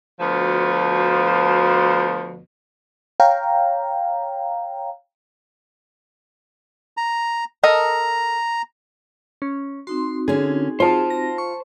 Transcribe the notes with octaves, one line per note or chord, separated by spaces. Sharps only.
D2 B2 F3
C#5 F5 G5 A#5
A#5
A4 A#4 D#5 A#5
C#4
C4 D#4 F#4 C6
D3 C#4 G#4
F4 C5 A5
A#6
C#6